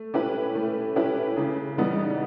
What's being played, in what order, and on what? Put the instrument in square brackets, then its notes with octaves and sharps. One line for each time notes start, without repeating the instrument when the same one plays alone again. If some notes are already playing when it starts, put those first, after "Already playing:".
Already playing: [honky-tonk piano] A3
C#4 E4 G4 B4
A3
C#4 E4 G4 B4
C#3
E3 G3 B3 D#4